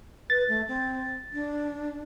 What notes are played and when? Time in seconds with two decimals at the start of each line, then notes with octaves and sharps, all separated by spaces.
0.30 B4 A6
0.49 A3
0.68 C4
1.33 D4